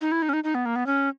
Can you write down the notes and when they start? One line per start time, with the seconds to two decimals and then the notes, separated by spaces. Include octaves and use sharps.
0.01 D#4
0.12 E4
0.22 D#4
0.29 C#4
0.33 D#4
0.44 D#4
0.55 B3
0.66 A#3
0.76 B3
0.86 C#4